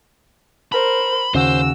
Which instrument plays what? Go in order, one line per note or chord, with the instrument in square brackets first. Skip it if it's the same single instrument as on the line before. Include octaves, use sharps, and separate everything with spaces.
[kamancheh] A#4 C5 [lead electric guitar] B5
[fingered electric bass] D#2 C#3 [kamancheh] F#4 E6 [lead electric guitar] C5